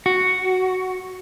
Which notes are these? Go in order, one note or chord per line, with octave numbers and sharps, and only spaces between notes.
F#4